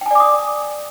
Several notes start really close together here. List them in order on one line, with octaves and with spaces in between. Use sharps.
G5 G#5 D5 D6 D#6